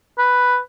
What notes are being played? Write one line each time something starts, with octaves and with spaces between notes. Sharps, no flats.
B4